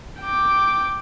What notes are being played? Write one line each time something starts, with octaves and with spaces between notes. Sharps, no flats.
G5 D6